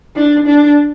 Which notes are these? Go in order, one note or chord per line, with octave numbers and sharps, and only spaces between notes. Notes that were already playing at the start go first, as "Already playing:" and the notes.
D4
D4